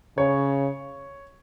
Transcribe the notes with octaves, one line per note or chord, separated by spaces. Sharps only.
C#3 C#5